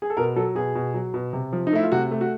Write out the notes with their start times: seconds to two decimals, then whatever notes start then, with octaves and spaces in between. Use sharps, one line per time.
0.02 G#4
0.10 A4
0.17 B2 A#4
0.36 F#3 A4
0.55 B2 G#4
0.75 B2
0.94 F#3
1.14 B2
1.33 C3
1.53 F3
1.67 D#4
1.73 A3 E4
1.83 F4
1.92 C3 F#4
2.11 A3
2.21 F#4